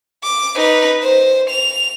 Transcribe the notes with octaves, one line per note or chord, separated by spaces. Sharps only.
D6
D#4 B4
C5
F7